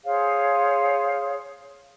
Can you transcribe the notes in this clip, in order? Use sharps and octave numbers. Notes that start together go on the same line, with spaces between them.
G#4 C5 C#5 F5